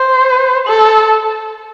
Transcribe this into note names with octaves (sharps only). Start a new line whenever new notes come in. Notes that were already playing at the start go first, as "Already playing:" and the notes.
Already playing: C5
A4